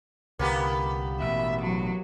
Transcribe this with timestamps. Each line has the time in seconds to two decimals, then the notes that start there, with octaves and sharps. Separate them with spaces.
0.39 C2 D3 A#3 B3 G4
1.20 A1 B2 E5
1.61 F#3